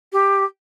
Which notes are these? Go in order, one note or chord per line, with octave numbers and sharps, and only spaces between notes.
G4